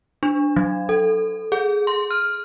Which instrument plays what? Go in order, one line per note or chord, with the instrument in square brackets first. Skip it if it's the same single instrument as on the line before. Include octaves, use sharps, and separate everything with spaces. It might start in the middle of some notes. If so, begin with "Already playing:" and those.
[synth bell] D4
F#3
A4
G#4
C6
F6